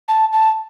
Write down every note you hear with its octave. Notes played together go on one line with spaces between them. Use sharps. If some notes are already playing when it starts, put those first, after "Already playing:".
A5
A5